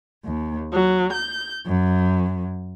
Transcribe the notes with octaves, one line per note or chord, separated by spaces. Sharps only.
D#2
F#3
G6
F#2